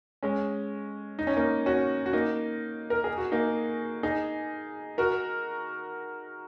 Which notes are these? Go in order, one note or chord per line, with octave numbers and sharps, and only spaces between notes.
G#3 C#4
D#4
C#4
A#3 D#4
C#4 F#4
F#4
A#3 D#4
A#4
G#4
F#4
A#3 D#4
D#4 G#4
F#4 A#4